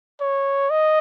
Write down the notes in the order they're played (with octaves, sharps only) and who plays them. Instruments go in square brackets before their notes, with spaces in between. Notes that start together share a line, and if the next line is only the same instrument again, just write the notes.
[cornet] C#5
D#5